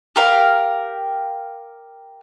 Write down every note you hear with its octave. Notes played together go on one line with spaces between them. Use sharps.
G4 A#4 F5